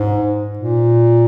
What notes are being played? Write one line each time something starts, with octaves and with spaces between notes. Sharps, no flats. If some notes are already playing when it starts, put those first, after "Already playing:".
Already playing: G#2
A#2